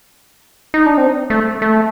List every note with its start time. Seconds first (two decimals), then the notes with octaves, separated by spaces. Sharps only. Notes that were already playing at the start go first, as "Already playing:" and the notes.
0.74 D#4
0.86 D4
0.98 C4
1.30 A3
1.62 A3